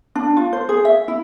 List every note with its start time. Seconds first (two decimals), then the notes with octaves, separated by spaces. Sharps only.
0.15 D4
0.37 F4
0.53 C5
0.69 G#4
0.85 E5
1.08 E4